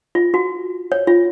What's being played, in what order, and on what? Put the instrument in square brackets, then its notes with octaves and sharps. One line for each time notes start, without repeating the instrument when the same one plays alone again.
[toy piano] F4
F#4
C#5
F4